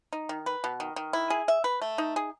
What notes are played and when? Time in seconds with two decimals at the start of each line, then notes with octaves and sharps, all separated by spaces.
0.13 D#4
0.29 D#3
0.46 B4
0.64 B2
0.80 D#3
0.96 D#3
1.13 E4
1.30 G#4
1.48 E5
1.64 B4
1.82 A3
1.98 D#4
2.16 G#4